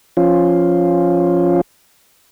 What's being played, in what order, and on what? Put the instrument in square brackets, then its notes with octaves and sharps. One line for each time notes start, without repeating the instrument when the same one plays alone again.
[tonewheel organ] F3 C#4 F4